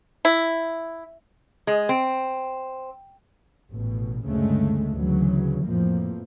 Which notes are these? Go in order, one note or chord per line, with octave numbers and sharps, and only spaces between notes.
E4
G#3
C4
A1 B2
D2 G2 C#3 G#3 A3
D2 C#3 E3 F#3
F2 A2 E3 F3 A#3